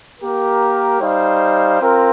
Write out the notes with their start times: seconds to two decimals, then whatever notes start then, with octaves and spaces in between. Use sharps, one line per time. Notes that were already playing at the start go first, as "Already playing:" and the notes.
0.20 A#3 G4 A#4
1.00 G3 D#4 C5 F5
1.80 C4 F4 A#4